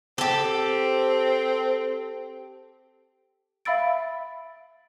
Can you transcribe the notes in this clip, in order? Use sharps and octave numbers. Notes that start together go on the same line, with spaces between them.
C4 G4 A4
E5 F5 B5 E6 A6 D7